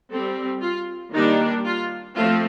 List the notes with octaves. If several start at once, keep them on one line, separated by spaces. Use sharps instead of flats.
G3 C4 A4
F4
D#3 G3 A#3 D4 D#4
F4
F3 A3 C4 F4